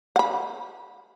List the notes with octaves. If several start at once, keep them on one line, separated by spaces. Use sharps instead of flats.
F#5 B5